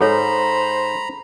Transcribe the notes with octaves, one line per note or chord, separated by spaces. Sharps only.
G#2 A4 C5 C#5 A#5 B5